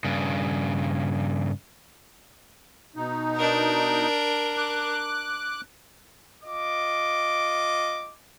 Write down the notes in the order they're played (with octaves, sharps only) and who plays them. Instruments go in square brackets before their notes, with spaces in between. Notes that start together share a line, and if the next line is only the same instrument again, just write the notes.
[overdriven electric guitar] G2 C#3
[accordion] B2 D#4
[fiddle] D4 A#4
[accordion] D6 F#6
[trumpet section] F4 D#5 D6